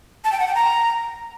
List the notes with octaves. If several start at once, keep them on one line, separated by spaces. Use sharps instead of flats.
A5
G5
F#5
G5
A#5